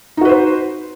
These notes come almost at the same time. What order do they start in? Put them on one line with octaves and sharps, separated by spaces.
D#4 F#4 B4 C5